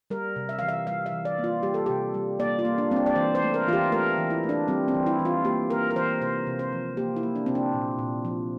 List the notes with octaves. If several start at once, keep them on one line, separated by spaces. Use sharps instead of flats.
G3 A#4
C3
E5
E3 F5
E5
G3 F5
E5
E3
D5
A#3
F4
G3 G4
A4
C3 G4
G3
A#3 D5
F4
A#3
D4
G3 C4
D4
D5
E3 C5
C5
A3
A#4
E3 F4
G4
A3 A#4
E3
E4
A3
D4
G3 C4
C4
E3
E4
E3
F4
A#3 G4
A#3 A#4
A#4
E3 C5
C3 C5
C3
C5
F3
A#3 G4
E4
A#3
D4
C3 C4
D4
A#2
A#2
F3